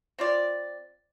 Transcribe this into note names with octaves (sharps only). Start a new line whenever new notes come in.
C4 F4 D5